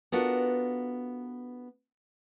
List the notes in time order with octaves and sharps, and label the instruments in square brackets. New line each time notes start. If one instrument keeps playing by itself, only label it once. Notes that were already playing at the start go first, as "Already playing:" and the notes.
[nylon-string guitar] B3 D4 F4 F#4 A4 A#4